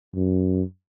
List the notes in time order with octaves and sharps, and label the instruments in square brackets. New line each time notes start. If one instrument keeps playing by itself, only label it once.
[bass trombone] F#2